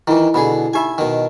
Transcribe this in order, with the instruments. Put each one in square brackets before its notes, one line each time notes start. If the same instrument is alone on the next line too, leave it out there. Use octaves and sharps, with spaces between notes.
[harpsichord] D#3 E3 [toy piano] E4 F4
[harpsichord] B2 D3 G#4 [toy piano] B5
[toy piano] D#4 G4 B5 [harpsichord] E5 G#5
[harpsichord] B2 D#3